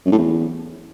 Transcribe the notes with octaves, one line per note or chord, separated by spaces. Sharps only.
F#2
A2
E2